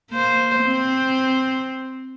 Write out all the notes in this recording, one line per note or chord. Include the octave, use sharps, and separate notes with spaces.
A#3 C5
C4